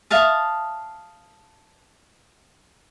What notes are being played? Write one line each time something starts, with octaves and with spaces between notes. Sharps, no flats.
E5 F5 A5 D#6